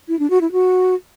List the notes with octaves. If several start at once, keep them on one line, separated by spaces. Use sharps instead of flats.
E4
D4
F#4
E4
F#4